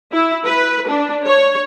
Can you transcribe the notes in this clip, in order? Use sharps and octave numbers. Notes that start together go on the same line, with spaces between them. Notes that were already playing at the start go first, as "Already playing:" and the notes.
E4
B4
D4
C#5